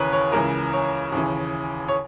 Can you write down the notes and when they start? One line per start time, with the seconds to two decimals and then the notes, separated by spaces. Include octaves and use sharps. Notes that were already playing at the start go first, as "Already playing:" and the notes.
Already playing: D#2 C#3 E3 A#4 B4 C#5
0.12 C#5
0.32 C#2 C#3 E3 A#4
0.73 C#5
1.12 D#2 C#3 E3
1.88 C#5